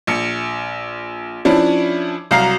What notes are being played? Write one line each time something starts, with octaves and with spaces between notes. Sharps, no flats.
A#1 C#7
F3 C#4 D4 E4
C2 F#3 F5 A#5 C7